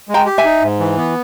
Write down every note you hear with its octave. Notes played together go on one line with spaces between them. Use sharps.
G#3
G5 A#5
G4
E5 G#5
D#4
G#2
E3
B3